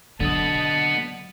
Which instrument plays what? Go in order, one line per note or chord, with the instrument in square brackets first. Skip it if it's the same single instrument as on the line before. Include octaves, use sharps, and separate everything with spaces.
[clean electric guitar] D3 [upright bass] F#3 [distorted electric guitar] B3 D#5 [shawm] A5